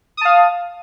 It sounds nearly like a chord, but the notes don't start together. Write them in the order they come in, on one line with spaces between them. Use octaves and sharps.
D#6 A5 F5